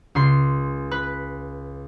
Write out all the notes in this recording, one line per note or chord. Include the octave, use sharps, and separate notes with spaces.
C#2 C6 C7
B4